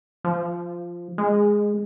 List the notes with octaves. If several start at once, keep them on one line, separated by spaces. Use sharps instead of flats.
F3
G#3